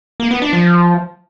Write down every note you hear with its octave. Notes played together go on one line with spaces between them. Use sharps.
A#3
B3
D4
F3